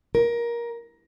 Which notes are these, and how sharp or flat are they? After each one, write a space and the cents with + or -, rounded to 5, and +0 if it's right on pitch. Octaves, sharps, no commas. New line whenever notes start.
A#4 +15